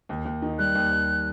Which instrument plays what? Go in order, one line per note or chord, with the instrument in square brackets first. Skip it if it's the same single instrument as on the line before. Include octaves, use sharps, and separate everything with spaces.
[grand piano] D#2
D#2
D#3
[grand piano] G3 [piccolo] F#6
[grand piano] D#2
D#2